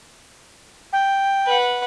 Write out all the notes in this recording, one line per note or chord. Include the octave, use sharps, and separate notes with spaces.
G5
B4 F#5